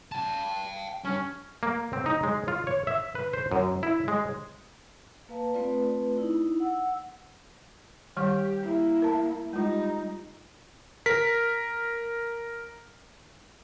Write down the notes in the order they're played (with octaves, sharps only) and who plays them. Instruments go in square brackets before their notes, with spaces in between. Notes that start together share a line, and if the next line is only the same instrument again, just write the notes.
[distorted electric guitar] G5 A5
[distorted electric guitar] G3 D4 [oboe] C#4
[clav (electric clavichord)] A#3
C4
D#4
G#3
F4
C#5
E5
B4
C5
F#2
E4
G#3
[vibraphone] A#3 B4 F5 A5
A3 C4 F4 B4 D5
D#4 E4
F#5 E6
[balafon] D#3 G3 C#6 [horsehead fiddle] G4
[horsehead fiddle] A#3 E4
[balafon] A#4 A5
[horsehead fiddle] G3 D#4 [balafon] G#3 F4
[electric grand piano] A#4 B6